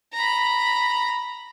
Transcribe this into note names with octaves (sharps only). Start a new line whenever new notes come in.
A#5 B5